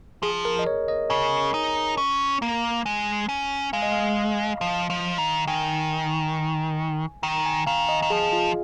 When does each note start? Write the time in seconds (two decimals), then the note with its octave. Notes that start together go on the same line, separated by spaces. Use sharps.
0.23 F3 G#4
0.45 A#4
0.59 D#5
0.67 C#5
0.88 D#5
1.10 C#3 G#5
1.54 D#4
1.97 C#4
2.42 A#3
2.86 G#3
3.29 C#4
3.73 G#3 F5
3.82 D#5
3.92 F5
4.61 F3
4.90 F3
5.18 D#3
5.47 D#3 G#5
7.23 D#3 A#5
7.45 G#5
7.67 D#3 F5
7.89 D#5
8.02 D#3
8.10 F3 G#4
8.33 F4